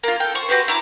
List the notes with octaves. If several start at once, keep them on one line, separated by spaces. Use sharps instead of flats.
A#3 F4
A4 G5
C5 C#6
F#4 G4 B4 C5
E4 A#5 C6 D6